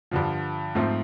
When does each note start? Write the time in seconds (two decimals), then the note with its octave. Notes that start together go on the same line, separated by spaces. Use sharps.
0.11 G2 D3 F3
0.75 G#2 F3 A3 C4